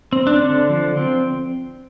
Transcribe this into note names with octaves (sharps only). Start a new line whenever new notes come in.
C4
D4
D3
F3
C4